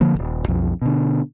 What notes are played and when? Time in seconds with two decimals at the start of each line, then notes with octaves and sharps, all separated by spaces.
0.01 D3 F3 A#3
0.15 D#1 A#1
0.48 B1 F2
0.82 B2 D3